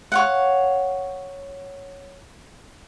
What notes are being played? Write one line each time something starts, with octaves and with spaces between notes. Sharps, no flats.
C#5 F5 F#5